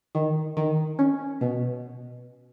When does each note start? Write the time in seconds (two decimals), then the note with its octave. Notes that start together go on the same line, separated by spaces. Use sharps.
0.15 D#3
0.57 D#3
0.99 C#4
1.41 B2